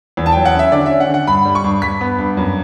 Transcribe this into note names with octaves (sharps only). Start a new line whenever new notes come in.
E2
A5
F#3 G5
F#5
C#4 E5
D3 D5
C#4 E5
F#5
D3
F#5
G2 B5
G3
C#6
G2
G2 B6
B3
G2
F#2